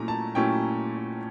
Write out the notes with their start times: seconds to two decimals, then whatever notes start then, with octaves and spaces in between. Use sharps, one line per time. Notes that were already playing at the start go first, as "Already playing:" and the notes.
Already playing: A#2 F#3 A3 C#4 E4 A#5
0.08 A5
0.35 A#2 F#3 A3 C#4 E4 G5